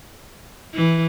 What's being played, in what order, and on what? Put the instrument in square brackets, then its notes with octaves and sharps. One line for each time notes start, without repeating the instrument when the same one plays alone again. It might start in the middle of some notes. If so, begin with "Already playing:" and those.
[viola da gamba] E3